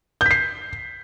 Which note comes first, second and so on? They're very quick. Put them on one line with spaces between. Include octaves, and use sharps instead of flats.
G6 B6 C7